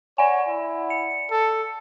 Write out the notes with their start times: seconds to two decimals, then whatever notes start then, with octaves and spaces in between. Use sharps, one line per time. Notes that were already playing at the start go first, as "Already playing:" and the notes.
0.18 C#5 D5 F#5 G#5
0.48 E4
0.90 C#7
1.31 A4